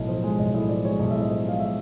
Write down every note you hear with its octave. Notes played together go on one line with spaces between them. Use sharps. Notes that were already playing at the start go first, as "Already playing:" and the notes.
Already playing: B1 A2 D#5
F3
G#3
B1 D#5
A2 D#5
F3 D5
G#3 C#5
B1 D#5
A2 E5
D#5
F3
G#3 F5
E5